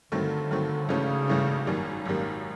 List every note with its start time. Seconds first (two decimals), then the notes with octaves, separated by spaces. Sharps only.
0.12 G2 D3 D#3 F#3 A3 C4
0.51 G2 D#3 F#3 A3 C4
0.89 G#1 G2 C#3 E3 A3 C#4
1.28 G#1 G2 E3 A3 C#4
1.67 G#1 F#2 D#3 G3 A#3
2.05 G#1 F#2 D#3 G3 A#3